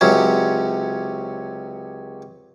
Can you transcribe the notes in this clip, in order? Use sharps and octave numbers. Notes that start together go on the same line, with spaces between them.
C#2 C3 F#3 C#4